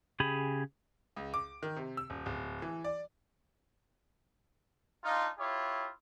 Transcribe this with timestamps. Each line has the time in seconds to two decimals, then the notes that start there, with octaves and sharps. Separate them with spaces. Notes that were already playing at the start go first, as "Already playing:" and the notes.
0.20 C#3 G4 G#4 G#5 B5
1.16 C#2
1.34 D6
1.63 D#3
1.76 C3
1.97 E6
2.10 D#1
2.26 D1
2.62 E3
2.84 D5
5.04 D4 D#4 F4
5.38 E4 F4 G4 C#5